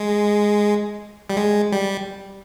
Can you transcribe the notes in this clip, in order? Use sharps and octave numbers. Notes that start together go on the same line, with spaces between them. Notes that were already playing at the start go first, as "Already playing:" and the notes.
Already playing: G#3
G3
G#3
G3